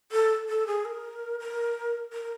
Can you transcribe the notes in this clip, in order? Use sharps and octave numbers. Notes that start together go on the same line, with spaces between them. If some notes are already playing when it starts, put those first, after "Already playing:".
A4
A4
G#4
A#4
A#4
A#4